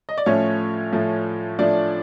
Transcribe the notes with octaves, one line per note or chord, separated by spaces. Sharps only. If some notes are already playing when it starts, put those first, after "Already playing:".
D#5
D5
A2 F3 A3 C#4 C#5
A2 F3 A3
A2 F3 A3 D4 D5